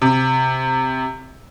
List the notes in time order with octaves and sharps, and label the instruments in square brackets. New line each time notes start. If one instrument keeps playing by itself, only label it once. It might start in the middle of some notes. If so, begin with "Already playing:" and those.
[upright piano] C3